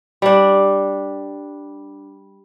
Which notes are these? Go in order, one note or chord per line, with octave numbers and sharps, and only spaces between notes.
G3 D4